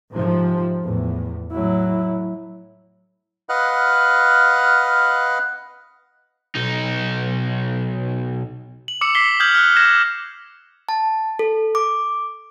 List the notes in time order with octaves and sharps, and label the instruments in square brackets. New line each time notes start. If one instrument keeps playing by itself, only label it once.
[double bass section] G#2 C3 F3
E2 A2
[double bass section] A2 [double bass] F#3 E4
[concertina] B4 D#5 F5 F#5 F6 F#6
[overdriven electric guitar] B1 D#4
[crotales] F#7
D6 E6 C#7
D6 B6 C7 G7
D#6 F6 G6 G#6 F#7 G7
F6 F#6
F6 G#6 A#6 E7
[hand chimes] A5
A4
D6